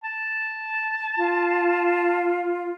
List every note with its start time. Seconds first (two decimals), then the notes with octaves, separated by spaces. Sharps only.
0.04 A5
1.17 F4